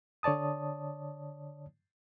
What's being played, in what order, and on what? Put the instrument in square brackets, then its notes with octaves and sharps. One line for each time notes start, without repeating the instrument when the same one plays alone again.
[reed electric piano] D3 C#5 D5 A5 D#6